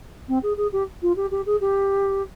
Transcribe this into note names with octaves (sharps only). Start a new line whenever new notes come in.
C4
G#4
G#4
G4
F4
G4
G4
G#4
G4